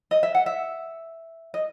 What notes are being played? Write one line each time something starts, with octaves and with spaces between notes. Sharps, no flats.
D#5
E5
F#5
E5
D#5